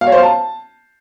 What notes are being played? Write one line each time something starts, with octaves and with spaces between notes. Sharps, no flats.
F5
C#5
C5
F5
A5